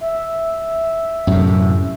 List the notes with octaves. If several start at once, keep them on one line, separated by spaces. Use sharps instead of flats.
E5
F#2 A2 C3